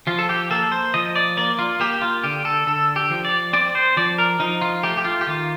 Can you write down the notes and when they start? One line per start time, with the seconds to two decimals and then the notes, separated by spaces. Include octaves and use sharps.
0.07 F3 F4
0.19 A4
0.29 G4
0.50 A#3 A4
0.72 C5
0.94 F3 D#5
1.16 D5
1.37 A#3 D5
1.59 F4
1.80 A#3 G4
2.02 F4
2.23 D3 G4
2.45 A4
2.67 D3 A4
2.96 G4
3.10 F3
3.25 D5
3.53 C4 D5
3.75 C5
3.97 F3 D5
4.18 A#4
4.40 F3 D#4
4.61 F4
4.83 A3 G4
4.97 G4
5.04 F4
5.21 G4
5.27 D#3 F4